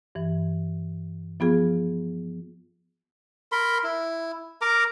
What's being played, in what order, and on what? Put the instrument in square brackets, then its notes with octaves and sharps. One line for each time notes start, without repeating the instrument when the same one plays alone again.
[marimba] G2 E3
F3 B3 F4 G#4
[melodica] A#4 B5 C6
E4
A#4 A#5 D6